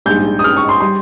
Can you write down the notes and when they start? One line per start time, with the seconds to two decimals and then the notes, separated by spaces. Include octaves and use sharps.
0.06 A#1 G#2 G3 G6
0.39 D#6
0.44 F6
0.57 C#6
0.69 C6
0.80 G3 C6